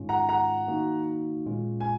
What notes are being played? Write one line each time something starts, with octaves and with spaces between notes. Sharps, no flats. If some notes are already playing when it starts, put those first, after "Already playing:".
Already playing: G#2 D#3 G#3 C#4 F4
F#5 A#5
F#5 A#5
D#3 A#3 D#4 F#4
A#2 G#3 C#4 F4
G#5